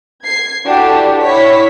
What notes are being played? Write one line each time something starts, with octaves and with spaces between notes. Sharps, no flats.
G#6 C7
D4 E4 F#4 G4 A4
E4 C#5 B6